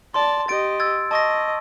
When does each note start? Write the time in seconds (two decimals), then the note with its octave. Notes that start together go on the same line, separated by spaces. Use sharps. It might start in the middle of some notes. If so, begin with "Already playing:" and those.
0.14 D5 A5 C6
0.48 G4 D#5 A6 D7
0.80 E6 G#6 A6
1.11 D#5 A5 C#6 A#6